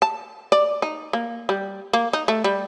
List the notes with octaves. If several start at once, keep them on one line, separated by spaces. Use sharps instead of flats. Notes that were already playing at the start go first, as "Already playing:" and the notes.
A5
D5
D#4
A#3
G3
A#3
D#4
A3
G3